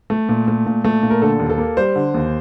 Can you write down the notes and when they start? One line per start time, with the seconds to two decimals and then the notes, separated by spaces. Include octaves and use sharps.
0.10 A3
0.29 A#2
0.48 A3
0.66 A#2
0.84 A3
1.03 A#2
1.10 A#4
1.22 D3 A4
1.39 D#2
1.50 A4
1.58 A#3
1.77 G3 C5
1.95 D3
2.14 D#2